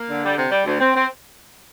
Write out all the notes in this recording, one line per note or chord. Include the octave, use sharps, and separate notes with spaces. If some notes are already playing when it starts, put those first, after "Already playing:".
Already playing: A#3
D3
G3
C3
G3
D2
C4
C4